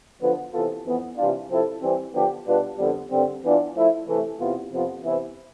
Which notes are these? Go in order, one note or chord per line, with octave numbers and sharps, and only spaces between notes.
D3 F3 B3
C3 E3 B3 F4 A4
F2 E3 B3
C3 E3 G3 D4 F4
C3 F3 C4 E4 A4
E3 G3 C4
D3 F3 B3 D4 G4
B2 G3 D4 F4 B4
F2 D3 G3 B3
G2 D3 G3 C4
E3 B3 D4 F4
F3 A3 E4
C3 E3 A3
E2 C3 E3 B3 F4
F2 C3 F3 B3 F4
C3 E3 B3 E4